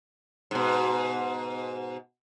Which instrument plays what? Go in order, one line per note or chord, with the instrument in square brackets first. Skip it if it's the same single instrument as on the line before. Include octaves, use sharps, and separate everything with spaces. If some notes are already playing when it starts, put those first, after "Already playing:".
[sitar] G#2 B2